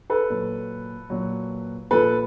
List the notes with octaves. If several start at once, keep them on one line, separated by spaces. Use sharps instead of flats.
A4 B4
A#2 F#3
A#2 F#3
A#2 F3 A4 B4